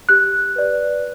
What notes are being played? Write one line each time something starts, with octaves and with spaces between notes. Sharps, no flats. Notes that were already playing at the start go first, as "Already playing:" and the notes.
G4 F#6
B4 D5